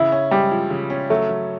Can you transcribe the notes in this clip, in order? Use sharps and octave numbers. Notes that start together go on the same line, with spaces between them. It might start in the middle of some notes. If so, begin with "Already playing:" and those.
Already playing: C#3 E4
C#4
G3 G#3
F3
C#3
C#4
F#3 A3
F#3